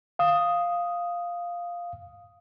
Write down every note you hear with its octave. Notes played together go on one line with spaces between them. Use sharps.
F5 D#6